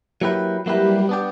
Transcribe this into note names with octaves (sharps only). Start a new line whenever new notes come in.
F#3 A#3 E4 G4 B4
F#3 G3 A#3 E4 G4 B4
B3 D4 G4